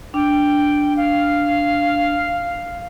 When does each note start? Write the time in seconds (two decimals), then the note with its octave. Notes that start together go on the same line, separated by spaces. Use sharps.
0.14 D4 G5
0.96 F5